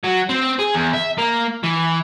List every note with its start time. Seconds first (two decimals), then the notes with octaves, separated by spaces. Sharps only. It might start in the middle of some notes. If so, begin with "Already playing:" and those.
0.04 F#3
0.29 C4
0.59 G#4
0.74 E2
0.93 E5
1.18 A#3
1.63 E3